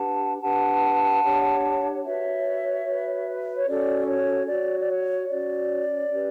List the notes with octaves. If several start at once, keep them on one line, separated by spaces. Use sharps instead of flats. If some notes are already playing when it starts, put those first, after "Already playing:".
Already playing: D4 G4 B4 F#5 A5
D4 G4 B4 F#5 A5
D4 G4 C#5
F#4 B4 C#5 E5
F#4 B4
C#5
C#4 F#4 A4 C#5 D5
C#5
F#4 C#5 D5
D5
C#5
C#4 F#4 C#5 D5
C#4 G4 B4